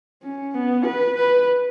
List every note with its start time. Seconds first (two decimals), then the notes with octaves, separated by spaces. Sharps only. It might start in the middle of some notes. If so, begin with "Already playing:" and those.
0.23 C#4
0.54 B3
0.85 B4
1.17 B4